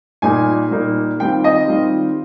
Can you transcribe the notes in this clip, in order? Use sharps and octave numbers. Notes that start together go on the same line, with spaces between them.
A#2 G3 A#3 D#4 G#5
A#2 G3 A#3 D#4
D#3 G3 C4 F4 G5
D#5
D#3 G3 C4 F4